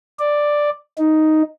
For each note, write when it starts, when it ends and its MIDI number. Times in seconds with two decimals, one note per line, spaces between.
0.19 0.70 74
0.98 1.43 63